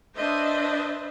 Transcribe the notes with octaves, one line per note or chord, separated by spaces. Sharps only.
D4 B4 C5 D#5 E5